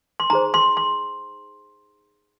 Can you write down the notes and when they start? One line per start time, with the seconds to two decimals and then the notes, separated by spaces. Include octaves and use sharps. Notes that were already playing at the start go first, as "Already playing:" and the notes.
0.20 C6
0.30 D#4 G#4 C5 A#5
0.54 C6
0.77 C6